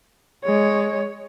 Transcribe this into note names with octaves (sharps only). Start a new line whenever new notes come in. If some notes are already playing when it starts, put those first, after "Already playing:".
G#3 C#5